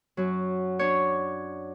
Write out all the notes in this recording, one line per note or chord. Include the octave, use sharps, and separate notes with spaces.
F#2 F#3
D4 C#5